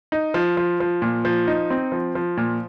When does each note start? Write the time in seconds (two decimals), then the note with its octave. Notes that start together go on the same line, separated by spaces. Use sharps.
0.12 D#4
0.34 F3
0.57 F3
0.80 F3
1.02 A#2
1.25 F3
1.47 D#4
1.70 C4
1.92 F3
2.15 F3
2.37 A#2